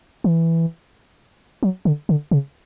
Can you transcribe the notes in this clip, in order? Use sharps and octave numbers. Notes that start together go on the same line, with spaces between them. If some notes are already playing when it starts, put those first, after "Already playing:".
E3
F#3
D3
D3
C#3